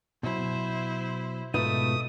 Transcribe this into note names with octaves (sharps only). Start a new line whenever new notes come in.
B2 F#3 E4 C5
G#2 B2 A3 D#4 F4 B4 D#6